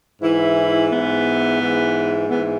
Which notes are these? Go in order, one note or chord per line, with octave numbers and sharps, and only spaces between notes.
G#2 E3 E4
G#2 E3 B3
G#2 E3
G#2 E3 B3